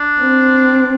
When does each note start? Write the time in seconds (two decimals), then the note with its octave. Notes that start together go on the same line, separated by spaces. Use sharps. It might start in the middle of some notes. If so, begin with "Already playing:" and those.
Already playing: D4
0.20 C4